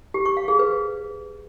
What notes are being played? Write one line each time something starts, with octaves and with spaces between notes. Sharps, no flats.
G4
C#6
F5
G#4
B4